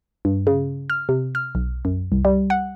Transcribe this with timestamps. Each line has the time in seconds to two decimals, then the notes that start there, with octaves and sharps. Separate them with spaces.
0.25 G2
0.47 C#3
0.90 F6
1.09 C3
1.35 F6
1.55 B1
1.85 F#2
2.12 C2
2.25 G3
2.50 F#5